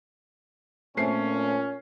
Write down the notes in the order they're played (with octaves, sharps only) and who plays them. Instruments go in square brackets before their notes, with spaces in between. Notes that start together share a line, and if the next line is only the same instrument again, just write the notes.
[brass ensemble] A#2 C#4 [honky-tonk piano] A3 C4 C7